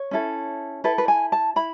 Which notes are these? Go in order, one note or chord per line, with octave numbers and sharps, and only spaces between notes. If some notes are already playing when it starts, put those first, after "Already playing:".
Already playing: C#5
C#4 E4 A4
E4 A4 B4
B4
G#5
A5
E4 B5